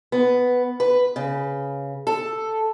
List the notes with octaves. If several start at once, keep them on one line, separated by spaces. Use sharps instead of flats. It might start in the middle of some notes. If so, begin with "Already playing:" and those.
B3
B4
C#3
A4